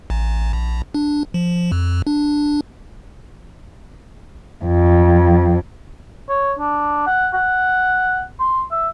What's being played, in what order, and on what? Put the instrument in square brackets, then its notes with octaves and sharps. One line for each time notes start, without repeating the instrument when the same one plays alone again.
[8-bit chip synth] A1
A#1
D4
F3
F2
D4
[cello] F2
[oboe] C#5
D4
F#5
F#5
C6
E5